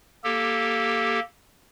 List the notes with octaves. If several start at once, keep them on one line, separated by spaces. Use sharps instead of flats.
A#3 G4 A4